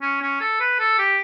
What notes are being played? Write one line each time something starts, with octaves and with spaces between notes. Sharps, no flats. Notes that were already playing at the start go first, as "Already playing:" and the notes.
C#4
C#4
A4
B4
A4
G4